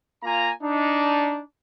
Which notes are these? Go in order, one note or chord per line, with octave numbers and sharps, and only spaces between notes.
A#3 F4 G#5 A#5
D4 D#4